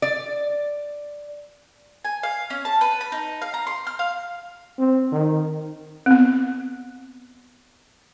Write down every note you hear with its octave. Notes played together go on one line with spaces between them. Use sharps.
D5
G#5
F5
C#4
A5
B4
B5
D#4
F5
A#5
C6
F6
F5
C4
D#3
B3 C4